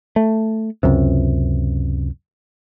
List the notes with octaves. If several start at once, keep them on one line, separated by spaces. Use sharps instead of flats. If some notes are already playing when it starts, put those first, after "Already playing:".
A3
C#2 F#2 C3